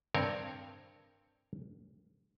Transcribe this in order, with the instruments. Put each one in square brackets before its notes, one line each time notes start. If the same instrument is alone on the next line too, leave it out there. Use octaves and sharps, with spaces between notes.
[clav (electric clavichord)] G2 C4 A#4 C#5